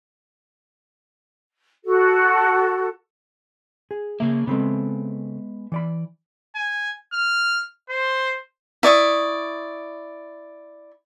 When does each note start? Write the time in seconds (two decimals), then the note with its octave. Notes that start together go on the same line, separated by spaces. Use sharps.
1.84 F#4 A4
3.91 G#4
4.20 C#3 A#3 G#4 E5
4.47 C#3 G#3 B3 C4 A4
5.72 E3 D5 B5
6.55 G#5
7.13 F6
7.90 C5
8.83 E4 D5 C#6 D#6